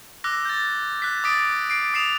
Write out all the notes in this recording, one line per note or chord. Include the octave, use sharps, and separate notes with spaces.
D6 E6 F#6 A#6
G6 A6
F#6 B6
D6 D#6 A6 B6 D7
C7 D7
D#6 C7 E7 F7